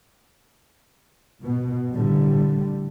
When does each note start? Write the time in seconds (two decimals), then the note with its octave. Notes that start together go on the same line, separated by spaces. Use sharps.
1.42 B2
1.94 A1 A2 D3 G3